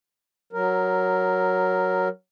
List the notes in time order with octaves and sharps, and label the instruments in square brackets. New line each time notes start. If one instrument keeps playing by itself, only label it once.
[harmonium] F#3 A#4